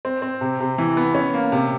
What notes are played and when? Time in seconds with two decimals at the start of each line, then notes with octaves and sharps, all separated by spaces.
0.05 C4
0.22 C4
0.41 C3
0.60 C3
0.78 E3
0.97 B3
1.15 C#4
1.34 A#3
1.52 C3